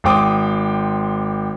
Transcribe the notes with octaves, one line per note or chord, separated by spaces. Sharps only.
G#1 C5 G5 D6 D#6